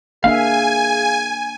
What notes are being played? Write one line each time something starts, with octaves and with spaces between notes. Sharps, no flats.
A#3 D4 G#4 E5 F5 G#5